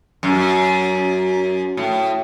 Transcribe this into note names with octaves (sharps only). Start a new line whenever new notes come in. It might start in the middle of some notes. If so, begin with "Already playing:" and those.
F#2
A2